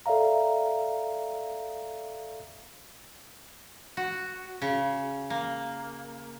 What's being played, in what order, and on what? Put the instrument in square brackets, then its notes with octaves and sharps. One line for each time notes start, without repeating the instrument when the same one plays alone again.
[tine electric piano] A4 D5 E5 F5 A#5
[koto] F#4
C#3
A#3